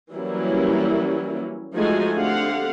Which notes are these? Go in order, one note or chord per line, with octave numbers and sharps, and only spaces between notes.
E3 F#3 G3 A#3 C#4 E4
F3 G#3 A3 D#4 F#4 G#5
D3 A3 C4 G4 F5 F#5